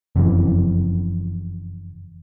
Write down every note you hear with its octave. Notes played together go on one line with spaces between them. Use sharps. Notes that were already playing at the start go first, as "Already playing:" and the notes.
F#1 F2 C#3 E3